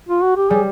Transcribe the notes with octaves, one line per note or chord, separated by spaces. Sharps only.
F4
F#4
G4
G3 G#4